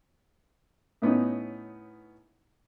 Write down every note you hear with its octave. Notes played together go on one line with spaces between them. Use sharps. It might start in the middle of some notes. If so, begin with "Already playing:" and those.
A2 B3 C#4 D#4